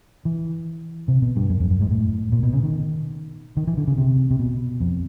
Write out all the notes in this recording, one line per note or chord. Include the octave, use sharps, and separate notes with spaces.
E3
C3
B2
G2
F#2
F2
F#2
G#2
A2
A#2
B2
C#3
D#3
D#3
E3
D3
C#3
C3
C3
B2
F2